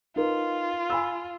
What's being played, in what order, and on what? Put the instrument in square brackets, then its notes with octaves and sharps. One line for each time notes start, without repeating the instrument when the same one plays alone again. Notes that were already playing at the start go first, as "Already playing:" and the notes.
[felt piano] D#4 A#4 B4 [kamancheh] F4
[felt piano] G#5 B5 E6